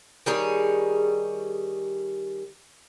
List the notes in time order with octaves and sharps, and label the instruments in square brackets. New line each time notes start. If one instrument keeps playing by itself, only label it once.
[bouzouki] D#3 G3 G#4 C#5